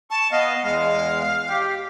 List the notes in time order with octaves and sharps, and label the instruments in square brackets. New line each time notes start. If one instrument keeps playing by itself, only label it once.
[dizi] A5 [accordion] C#6
[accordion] B3 D#5 [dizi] F5
[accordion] E2 G#3 [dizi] F5
[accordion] G4